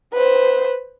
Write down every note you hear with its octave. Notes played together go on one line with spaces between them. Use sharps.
B4 C5